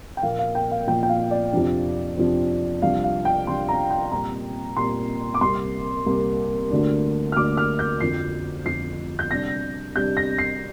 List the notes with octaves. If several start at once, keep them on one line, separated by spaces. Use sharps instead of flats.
G5
A#2 F3 A#3 F5
F5
G5
F5
A#2 F3 A#3 G5
G5
F5
D5
F2 C3 F3 D4
F2 C3 F3 D4
C2 C3 F3 D4 F5
F5
G5
C2 C3 F3 D4 C6
A#5
G5
A#2 G3 C4 A#5
A#2 G3 C4 C6
D6
C2 C3 A#3 C6
C2 C3 A#3
D2 D3 A#3 D4
F6
D2 D3 A#3 D4 D6
F6
G6
F2 D3 F3 C7
F2 D3 F3 C7
G6
C3 G3 D4 A#6
C3 G3 D4 G6
A#6
C7